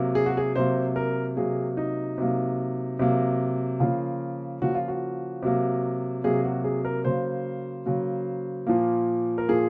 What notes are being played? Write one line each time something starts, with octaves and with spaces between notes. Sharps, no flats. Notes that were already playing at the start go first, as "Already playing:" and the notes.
Already playing: C3 F#3 A#3
G#4
F#4
G#4
C3 F#3 A#3 C5
A#4
C3 F#3 A#3 G#4
D#4
C3 F#3 A#3
C3 F#3 A#3
C#3 F3 A#3 F4
C#3 F3 A#3 F#4
F4
F#4
C3 F#3 A#3
C3 F#3 A#3 G#4
F#4
G#4
A#4
C#3 F#3 A#3 C5
C#3 F#3 A#3
A#2 F3 A#3
A#4
A#2 F3 A#3 G#4